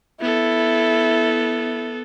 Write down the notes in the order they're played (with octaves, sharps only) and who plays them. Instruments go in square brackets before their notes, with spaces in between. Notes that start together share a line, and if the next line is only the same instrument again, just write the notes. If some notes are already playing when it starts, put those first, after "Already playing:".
[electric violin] B3 A4 [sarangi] E4